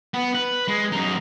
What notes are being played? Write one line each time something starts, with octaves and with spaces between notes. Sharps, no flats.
B3
B4
G#3
F#2 D#4